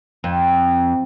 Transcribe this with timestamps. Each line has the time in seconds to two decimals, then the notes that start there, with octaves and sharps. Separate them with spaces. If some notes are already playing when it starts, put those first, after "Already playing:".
0.24 F2